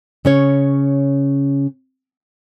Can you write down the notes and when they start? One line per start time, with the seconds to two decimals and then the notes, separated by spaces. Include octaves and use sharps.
0.25 C#3 C#4 C#5